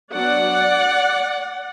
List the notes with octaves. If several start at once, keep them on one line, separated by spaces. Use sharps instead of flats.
F#3 B3 D4 D5 F#5